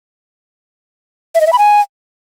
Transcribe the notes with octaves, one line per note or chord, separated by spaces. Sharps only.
E5
D#5
E5
B5
G#5